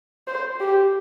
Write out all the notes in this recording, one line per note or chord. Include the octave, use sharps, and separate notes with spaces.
C5
G4